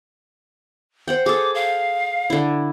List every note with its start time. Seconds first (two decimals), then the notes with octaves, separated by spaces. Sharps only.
1.08 C5 F#5 G5
1.26 G#4 A4 D6
1.55 F5
2.30 D3 E4